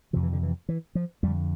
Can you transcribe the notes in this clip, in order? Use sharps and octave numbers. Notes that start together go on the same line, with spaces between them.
F2 C3 F3
E3
D3
E3
E3
F3
F2 D3 G3